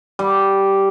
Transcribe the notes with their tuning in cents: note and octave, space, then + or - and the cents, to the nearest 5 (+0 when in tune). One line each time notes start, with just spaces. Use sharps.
G3 -5